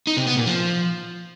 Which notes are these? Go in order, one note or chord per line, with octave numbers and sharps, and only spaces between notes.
D#4
C3
B3
A#2
F3